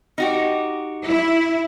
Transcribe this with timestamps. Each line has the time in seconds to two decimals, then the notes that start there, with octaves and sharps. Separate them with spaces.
0.18 D#4 F#4 G4
1.06 E4